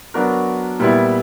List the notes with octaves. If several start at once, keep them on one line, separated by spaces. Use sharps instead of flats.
F#3 B3 D4 F#4 A#4
A#2 G3 B3 E4